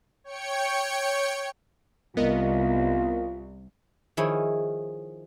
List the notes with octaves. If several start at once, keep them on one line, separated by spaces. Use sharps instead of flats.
C#5 G5 C#7
C2 B3 F4 A#4 D#5
D#3 F3 E4 G#4 C#5